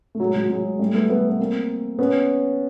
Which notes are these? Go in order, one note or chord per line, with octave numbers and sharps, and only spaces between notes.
A3
F#3 G#3
F#3 G#3
F#3 G#3
G3 A3
A3 B3
A3 B3
B3
A#3 C4
B3 C#4